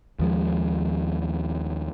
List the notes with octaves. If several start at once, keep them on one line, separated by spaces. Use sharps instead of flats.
D#2 F3 G#3